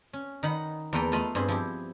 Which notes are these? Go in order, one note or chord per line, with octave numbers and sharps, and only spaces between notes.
C#4
D#3 D#4 F#5 B5
E2 A#3 A4 B4 G5 A#5
A3 F4 D#5 A#5 B5
G2 C4 G#4 B5
F3 E4 G4